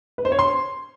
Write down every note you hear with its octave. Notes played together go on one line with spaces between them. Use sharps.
B4
C5
C#5
C6